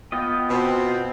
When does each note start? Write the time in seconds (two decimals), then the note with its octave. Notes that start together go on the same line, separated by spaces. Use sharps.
0.12 B3 F4 D#5 G5
0.50 B2 C4